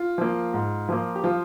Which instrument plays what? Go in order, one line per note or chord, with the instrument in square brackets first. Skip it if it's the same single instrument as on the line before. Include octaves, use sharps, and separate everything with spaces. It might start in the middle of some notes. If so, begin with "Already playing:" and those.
Already playing: [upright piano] F4
[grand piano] F3 A#3
G#2
F3 A#3
[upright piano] G4
[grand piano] F3 [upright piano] F4